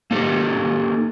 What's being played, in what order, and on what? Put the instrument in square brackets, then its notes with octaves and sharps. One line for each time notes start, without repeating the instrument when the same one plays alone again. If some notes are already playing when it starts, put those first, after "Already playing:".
[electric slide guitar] A#3 D#4 G4 A4